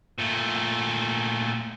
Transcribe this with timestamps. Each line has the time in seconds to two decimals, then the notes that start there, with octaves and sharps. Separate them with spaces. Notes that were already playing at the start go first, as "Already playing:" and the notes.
0.18 A#2 A3